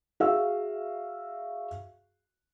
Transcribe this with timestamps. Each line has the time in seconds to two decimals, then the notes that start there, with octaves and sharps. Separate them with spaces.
0.20 F#4 G#4 E5 F5 E6